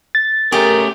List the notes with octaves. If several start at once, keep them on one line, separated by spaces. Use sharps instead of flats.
A6
A3 C#4 G4 G#4 A#4